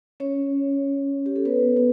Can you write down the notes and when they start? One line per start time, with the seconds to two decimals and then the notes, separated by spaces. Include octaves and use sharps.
0.20 C#4 C#5
1.26 G4
1.36 A4
1.45 B3 B4
1.76 B3 B4